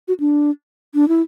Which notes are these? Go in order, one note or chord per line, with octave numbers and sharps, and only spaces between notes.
F#4
D4
D4
E4